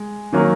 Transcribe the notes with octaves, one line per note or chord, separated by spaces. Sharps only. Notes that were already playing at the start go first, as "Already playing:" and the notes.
Already playing: G#3
D#3 F#3 A#3 C#4